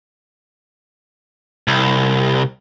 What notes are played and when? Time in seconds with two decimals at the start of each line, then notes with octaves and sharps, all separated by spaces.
1.68 C2